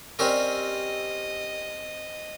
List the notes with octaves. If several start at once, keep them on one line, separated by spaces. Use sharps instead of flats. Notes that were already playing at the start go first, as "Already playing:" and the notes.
G3 C4 C#4 A#4 D#5